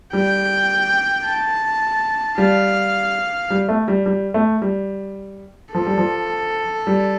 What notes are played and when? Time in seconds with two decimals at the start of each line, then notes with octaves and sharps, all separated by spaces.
0.13 G3 G5
1.26 A5
2.38 G3 F5
3.51 G3
3.69 A3
3.88 G3
4.06 G3
4.34 A3
4.62 G3
5.74 F3 A4
5.87 G3
5.98 F3
6.87 G3